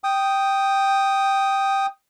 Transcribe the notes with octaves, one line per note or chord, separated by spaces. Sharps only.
G5 D#6